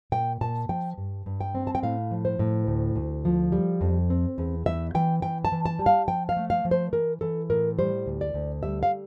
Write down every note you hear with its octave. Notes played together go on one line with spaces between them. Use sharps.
A#2 G5
A#2 A5
F3 G5
G2
G2
G5
C4
A5
G5
A2 F5
F3
C5
A2
D2
D2
F3
G3
F2
C4
E2
E2 E5
E3 G5
E3 G5
A5
E3
A5
G3
F5
F3 G5
F5
A3
F5
F3
C5
E3 A#4
E3 A4
A2 A#4
G3 C5
D2
D5
D2
G3 E5
F5